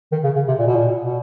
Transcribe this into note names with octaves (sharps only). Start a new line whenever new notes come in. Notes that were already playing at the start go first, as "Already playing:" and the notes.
D#3
C#3
C#3
C3
A#2
B2
A#2
B2